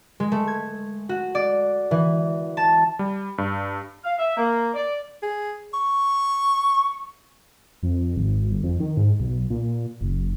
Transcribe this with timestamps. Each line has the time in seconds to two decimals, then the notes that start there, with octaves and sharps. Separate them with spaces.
0.20 G#3
0.32 A3
0.47 G#6
1.09 F#4
1.35 D5
1.91 E3
2.57 A5
2.99 G3
3.38 G2
4.04 F5
4.18 E5
4.37 A#3
4.74 D5
5.23 G#4
5.74 C#6
7.83 F2
8.17 G#1
8.50 G1
8.63 F2
8.80 D#3
8.97 G#2
9.20 B1
9.50 A#2
10.01 F#1